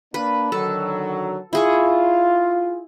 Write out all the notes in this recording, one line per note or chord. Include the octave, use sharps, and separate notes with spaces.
A#3 D4 B4
D3 D#3 F#3 A4
E4 F4 G#4 C#6